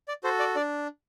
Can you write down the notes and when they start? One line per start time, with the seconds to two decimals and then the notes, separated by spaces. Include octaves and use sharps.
0.08 D5
0.24 F#4 A4 C5
0.39 D5
0.56 D4 D5